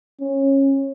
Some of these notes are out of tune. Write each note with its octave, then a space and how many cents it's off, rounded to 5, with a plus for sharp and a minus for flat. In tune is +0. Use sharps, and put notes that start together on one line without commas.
C#4 -20